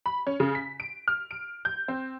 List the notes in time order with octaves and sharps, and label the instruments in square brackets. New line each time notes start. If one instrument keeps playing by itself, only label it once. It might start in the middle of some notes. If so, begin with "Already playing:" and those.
[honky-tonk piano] B5
C#4
C#3
B6
D7
F6
D7
G6
C4